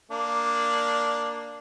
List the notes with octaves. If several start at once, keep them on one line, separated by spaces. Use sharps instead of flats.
A#3 D4